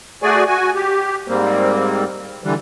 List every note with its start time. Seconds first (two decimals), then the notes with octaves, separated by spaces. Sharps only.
0.23 A3 F#4 G#4 D5 G#5
0.47 F#4 G#5
0.75 G4
1.28 G#2 G3 A#3 C4
2.44 D3 E3 G3